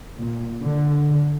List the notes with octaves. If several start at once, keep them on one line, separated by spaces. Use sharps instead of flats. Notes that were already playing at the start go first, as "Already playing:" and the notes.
A#2
D3